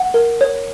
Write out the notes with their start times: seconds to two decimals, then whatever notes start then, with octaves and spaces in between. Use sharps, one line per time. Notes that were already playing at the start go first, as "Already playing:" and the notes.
Already playing: F#5
0.14 A#4
0.41 C#5